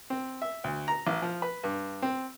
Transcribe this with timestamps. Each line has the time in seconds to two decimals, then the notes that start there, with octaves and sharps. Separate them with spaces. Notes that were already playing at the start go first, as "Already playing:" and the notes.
0.10 C4
0.42 E5
0.64 D2
0.88 A#5
1.07 A1
1.22 F3
1.42 B4
1.63 G2
2.02 C4